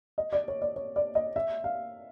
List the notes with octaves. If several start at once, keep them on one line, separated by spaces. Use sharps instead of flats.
D#5
D5
C#5
D5
C#5
D5
D#5
E5
F5